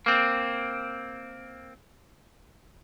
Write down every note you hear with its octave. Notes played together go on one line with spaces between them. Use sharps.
A#3 C4